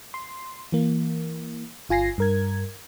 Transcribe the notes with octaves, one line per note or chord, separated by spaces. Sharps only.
C6
E3 A#3
G1 F4 G#5 A#6 C7
G2 A#4 G#6